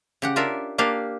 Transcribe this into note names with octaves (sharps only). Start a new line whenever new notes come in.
C#3 G4 F#5
D4 F4 A#4 E5
A#3 D4 G4 F5